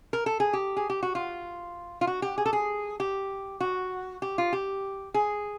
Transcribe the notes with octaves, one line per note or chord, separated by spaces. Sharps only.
A#4
A4
G#4
G4
G#4
G4
F#4
F4
F4
F#4
G4
G#4
A4
G#4
G4
F#4
G4
F4
G4
G#4